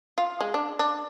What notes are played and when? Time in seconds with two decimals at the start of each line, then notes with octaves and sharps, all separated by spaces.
0.18 F4
0.41 G#3
0.54 D4
0.79 D4